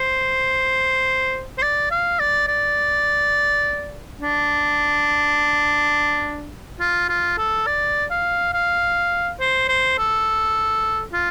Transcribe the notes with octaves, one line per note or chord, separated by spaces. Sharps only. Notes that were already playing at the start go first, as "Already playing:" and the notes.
Already playing: C5
C5
D5
F5
D5
D5
D4
F4
F4
A4
D5
F5
F5
C5
C5
A4
F4